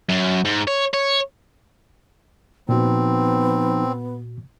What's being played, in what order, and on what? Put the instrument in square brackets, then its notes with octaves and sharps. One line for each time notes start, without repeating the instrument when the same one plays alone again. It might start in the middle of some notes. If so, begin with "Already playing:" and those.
[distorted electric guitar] F#2
G#2
C#5
C#5
[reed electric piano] A#2 F#4 [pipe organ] F3 D#4 [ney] B3 [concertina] C4